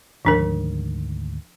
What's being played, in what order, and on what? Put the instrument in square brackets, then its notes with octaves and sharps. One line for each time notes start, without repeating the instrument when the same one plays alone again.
[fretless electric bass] D2 G#2 D#3 [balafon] F3 D4 A#4